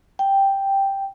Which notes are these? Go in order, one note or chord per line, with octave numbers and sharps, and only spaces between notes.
G5